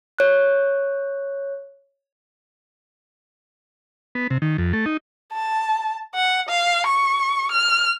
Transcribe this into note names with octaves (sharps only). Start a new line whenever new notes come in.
C#5 F#6
B3
C3
D#3
F2
A3
D#4
A5
F#5
F5
C#6
F6